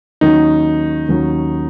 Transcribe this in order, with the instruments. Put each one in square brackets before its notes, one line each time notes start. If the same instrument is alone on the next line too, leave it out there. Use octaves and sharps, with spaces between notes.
[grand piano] D#2 D#3 F#3 C#4 [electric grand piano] D#4
[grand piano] D#2 D#3 F#3 C#4